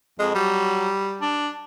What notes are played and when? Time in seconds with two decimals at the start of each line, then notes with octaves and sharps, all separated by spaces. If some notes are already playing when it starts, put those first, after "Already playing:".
0.19 F2 G#3
0.35 F#3 G3
1.21 D4